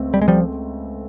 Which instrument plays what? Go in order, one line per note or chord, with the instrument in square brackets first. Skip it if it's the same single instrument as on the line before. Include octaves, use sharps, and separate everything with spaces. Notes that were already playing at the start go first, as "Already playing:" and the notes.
Already playing: [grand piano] C#2 A3 C4
[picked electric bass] G3
G#3
F3 G3